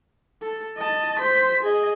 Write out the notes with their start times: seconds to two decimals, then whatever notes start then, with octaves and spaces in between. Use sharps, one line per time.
0.42 A4
0.77 D#5 A5
1.19 C5 B6
1.63 G#4 D#5